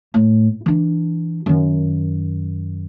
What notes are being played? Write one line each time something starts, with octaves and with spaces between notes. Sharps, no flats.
A2
E3 D4
F#2 D#3